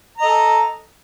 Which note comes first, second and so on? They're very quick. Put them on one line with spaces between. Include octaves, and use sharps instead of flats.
A#5 D#5 A4